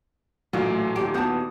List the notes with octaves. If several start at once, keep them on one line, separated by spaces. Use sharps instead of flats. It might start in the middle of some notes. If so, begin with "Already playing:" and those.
A1 A#2 F#3 A3 D4 F4
D#2 G4
D#2 E3 B3 F#4 F#5 A5 D#6 G6